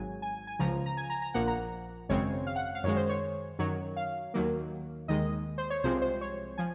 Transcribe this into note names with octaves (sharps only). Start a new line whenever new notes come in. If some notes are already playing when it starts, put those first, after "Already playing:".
Already playing: G#1 G#2 F#3 G#5
G#5
G#5
C#2 C#3 F3 A#5
A#5
G#5
A#5
A#5
A#1 A#2 F3 A#3 F#5
A#5
G#1 F#2 C#3 G#3 C4 C#5
F5
F#5
F5
F#2 D#3 G#3 C#5
C5
C#5
F#2 D#3 F#3 C#5
F5
D#2 D#3 F#3 A#3
D#2 D#3 G#3 D#5
C5
C#5
C2 C3 F3 G#3 C4 C5
C5
C#5
F3 G#5